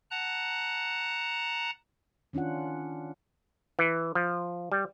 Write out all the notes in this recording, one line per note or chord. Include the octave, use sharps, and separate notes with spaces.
F#5 A5 A#5 F#6
D#3 C#4 D4 F4 F#5
E3
F3
G3